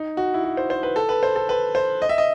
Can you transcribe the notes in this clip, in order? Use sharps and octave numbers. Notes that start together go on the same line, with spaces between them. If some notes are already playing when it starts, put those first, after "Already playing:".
Already playing: D#4
F#4
E4
F#4
C5
C5
B4
A4
B4
C5
A4
B4
C5
D#5
E5
D#5